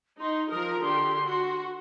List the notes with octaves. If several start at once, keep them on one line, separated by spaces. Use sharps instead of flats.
D#4 C6
F3 A#4 D#6
D3 G4 C6
F#4